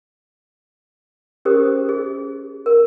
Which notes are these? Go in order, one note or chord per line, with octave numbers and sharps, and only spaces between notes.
C#4 G4 G#4 A#4 C5 D#6
G#4
A#4